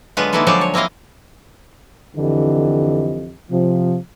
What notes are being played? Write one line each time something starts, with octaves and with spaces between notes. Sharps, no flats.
D3 F#3 G#3 B3 F4 B4
D#3 G#3 A#3 E4 A4 B4
D3 F3 F#3 G#3 C5 D5
C#5
A#3 C4 E4 D#5 F5
F2 D3 E3 G4 D#5
C3 F3